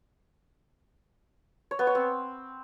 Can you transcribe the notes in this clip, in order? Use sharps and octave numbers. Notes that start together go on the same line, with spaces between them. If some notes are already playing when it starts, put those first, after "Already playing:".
C#5
B3
C#5
C4